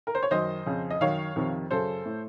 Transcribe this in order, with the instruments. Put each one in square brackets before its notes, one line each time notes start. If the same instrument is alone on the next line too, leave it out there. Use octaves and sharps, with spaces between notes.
[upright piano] A#4
C5
C#5
F#2 D#3 C5 D#5
F2 C#3
D#5
F#2 D#3 C#5 F5
F2 C3 D#3
F#2 C#3 A4 C5
A2